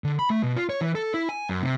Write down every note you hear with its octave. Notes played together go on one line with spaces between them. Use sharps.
D3
B5
A3
B2
F4
C#5
E3
A4
E4
G#5
F#2
C3